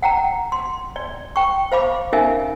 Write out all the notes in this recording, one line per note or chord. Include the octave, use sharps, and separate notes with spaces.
F#5 G5 A#5
C6
D5
G5 C#6
C5 F5 B5 D6
C#4 D#4 A#4 E5 F5 G#5